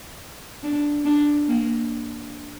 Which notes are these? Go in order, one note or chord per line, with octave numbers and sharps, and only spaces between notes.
D4
D4
A#3